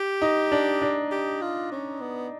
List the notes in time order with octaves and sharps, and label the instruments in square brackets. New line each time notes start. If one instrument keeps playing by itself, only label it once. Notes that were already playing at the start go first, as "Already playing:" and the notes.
Already playing: [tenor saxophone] G4
[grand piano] D#4
D4
D4
[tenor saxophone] G4
F4
C#4
B3